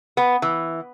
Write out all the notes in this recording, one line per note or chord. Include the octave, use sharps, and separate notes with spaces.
B3
E3